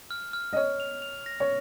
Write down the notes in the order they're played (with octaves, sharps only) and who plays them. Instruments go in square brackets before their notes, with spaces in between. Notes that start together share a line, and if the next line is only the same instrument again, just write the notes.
[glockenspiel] F6
F6
[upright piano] D#5
[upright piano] C#5 [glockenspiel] F6
[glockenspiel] F7
F7
A#6
[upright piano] C#5